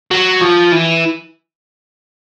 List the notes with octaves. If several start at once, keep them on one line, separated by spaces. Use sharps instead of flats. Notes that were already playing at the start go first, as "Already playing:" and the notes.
F#3
F3
E3